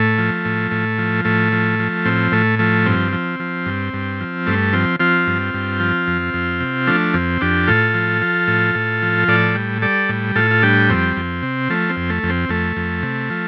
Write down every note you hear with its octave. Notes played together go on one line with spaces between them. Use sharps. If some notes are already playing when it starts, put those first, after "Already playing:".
Already playing: A2 A3
F3
A2
A2
F3
A2 A3
F3
F3
A2 C4
A2 A3
F3 A3
G2 C4
F3
F3
G2
G2
F3
G2 A3
F3 C4
F3 C4 F4
G2
G2
F3
F2
F2
C3
F3 A3 D4
F2 C4
F2 D4 G4
A2 F4 A4
F3
F3
A2
A2
F3
A2 A4 D5
G3
G3 A4 D5
A2
A2 F4 A4
F4
G3 D4 G4
F2 C4
F2
C3
F3 A3
C4
F2
A3
F2
C4
F2 A3
F2
C3
F3